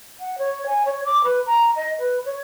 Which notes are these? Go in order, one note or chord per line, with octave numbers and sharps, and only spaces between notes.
F#5
C#5
G#5
C#5
D6
B4
A#5
D#5
B4
C#5